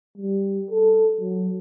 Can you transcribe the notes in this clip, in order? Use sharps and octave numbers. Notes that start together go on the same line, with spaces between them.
G3
A4
F#3